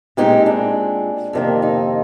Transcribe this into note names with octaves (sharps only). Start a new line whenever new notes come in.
A#2 G#3 C4 D#4 G4
D4
F2 C3 D#3 A#3
D#4